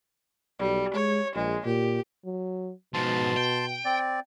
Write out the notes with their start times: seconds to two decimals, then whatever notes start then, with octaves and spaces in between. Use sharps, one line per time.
0.59 B1 G3
0.94 G#3 C#5
1.35 A#1 G#3
1.66 A#2 G4
2.25 F#3
2.94 G#2 B2 F3 A5 C6
3.36 G5
3.85 C4 D5